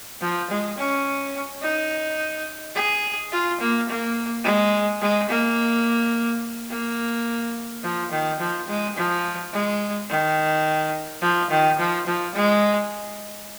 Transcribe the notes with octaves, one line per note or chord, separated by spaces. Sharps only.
F3
G#3
C#4
D#4
G#4
F4
A#3
A#3
G#3
G#3
A#3
A#3
F3
D#3
F3
G#3
F3
G#3
D#3
F3
D#3
F3
F3
G#3